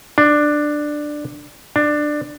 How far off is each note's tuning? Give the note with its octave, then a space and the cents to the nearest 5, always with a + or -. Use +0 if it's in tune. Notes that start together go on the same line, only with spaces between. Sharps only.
D4 +10
D4 +15